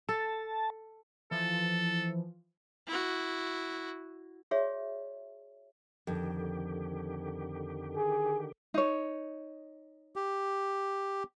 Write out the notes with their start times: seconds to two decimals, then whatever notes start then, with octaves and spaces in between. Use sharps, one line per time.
0.09 A4 A5
1.31 E3 F3 A4
2.87 E4 F#4
4.51 F#4 G#4 C#5 D5 E5
6.07 F2 D3 D#3 G4
7.96 G#4
8.74 D#4 C#5
10.16 G4